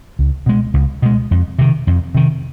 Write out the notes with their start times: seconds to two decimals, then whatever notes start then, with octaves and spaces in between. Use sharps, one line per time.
0.19 C#2
0.46 B2 G#3
0.74 C#2
1.02 B2 G#3
1.31 F2
1.59 C3 D#3
1.87 F2
2.15 C3 D#3